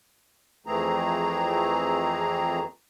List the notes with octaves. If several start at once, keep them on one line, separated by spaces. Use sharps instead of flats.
F2 E3 A3 C4 G#4 A#5